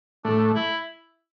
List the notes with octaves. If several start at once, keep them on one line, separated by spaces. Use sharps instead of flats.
A2 A3 D4
E4